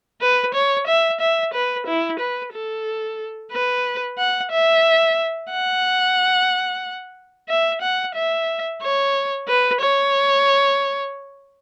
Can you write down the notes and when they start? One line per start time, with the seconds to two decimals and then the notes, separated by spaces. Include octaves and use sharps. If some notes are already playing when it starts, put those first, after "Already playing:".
0.21 B4
0.54 C#5
0.87 E5
1.20 E5
1.53 B4
1.87 E4
2.19 B4
2.53 A4
3.52 B4
4.18 F#5
4.52 E5
5.50 F#5
7.49 E5
7.82 F#5
8.15 E5
8.82 C#5
9.48 B4
9.80 C#5